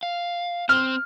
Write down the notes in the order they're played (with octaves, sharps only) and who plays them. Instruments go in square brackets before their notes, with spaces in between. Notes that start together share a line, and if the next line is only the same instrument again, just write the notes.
[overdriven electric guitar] F5
[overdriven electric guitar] C4 C5 [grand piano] F6